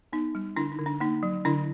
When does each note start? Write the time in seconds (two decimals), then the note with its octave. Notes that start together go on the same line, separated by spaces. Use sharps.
0.13 B3 D#4
0.35 G3
0.56 D3 D4 E4
0.72 D#4
0.79 D3
0.86 D4
1.00 A#3 D#4
1.23 F#3
1.45 D3 D4 E4